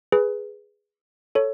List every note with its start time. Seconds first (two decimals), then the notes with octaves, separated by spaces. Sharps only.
0.12 G#4 B4
1.35 A4 C#5